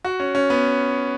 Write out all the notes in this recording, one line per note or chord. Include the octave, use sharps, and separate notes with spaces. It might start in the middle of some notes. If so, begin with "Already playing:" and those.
F#4
C#4
C#4
B3